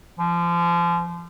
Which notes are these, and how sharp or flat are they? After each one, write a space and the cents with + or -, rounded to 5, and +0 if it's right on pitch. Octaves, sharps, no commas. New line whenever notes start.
F3 -30